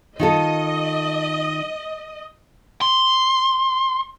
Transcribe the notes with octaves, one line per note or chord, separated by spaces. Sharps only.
D#3 F4 A4 D#5
C6